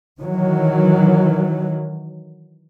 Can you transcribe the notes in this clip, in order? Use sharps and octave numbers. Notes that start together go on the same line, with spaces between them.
D#3 E3 F#3